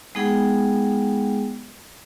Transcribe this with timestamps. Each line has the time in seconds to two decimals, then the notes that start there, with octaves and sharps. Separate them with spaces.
0.15 G#3 B3 D#4 G#4 F#5 G5